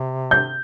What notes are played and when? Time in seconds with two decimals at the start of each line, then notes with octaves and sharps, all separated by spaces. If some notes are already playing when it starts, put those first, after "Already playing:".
Already playing: C3
0.31 G6